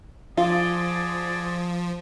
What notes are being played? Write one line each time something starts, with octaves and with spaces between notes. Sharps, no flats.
F3 F4 F#4 G#4 D5